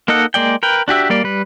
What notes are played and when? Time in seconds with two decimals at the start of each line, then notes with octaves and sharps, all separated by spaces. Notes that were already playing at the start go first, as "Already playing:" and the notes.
0.08 A#3 D#4 A4 D#5 F#5
0.34 G#3 A#3 D5 G5
0.63 A#4 B4 G5
0.88 D4 F#4 G4 E5
1.10 G3 A#3 D5
1.24 G3 B4